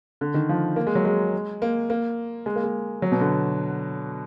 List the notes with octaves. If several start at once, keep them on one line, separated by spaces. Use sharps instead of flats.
D3
D#3
F3
A#3
G#3
F#3
G#3
A#3
A#3
G#3
A#3
G#3
F#3
B2
D3